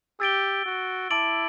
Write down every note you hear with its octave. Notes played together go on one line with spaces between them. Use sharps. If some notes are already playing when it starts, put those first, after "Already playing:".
G4 E6 A6 D7 G7
F#4
E4 A5 D6 A6 D7 F#7